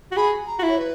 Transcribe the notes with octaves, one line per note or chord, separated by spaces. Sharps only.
F#4
G#4 B5
A#5
F#4
E4
C#5
B4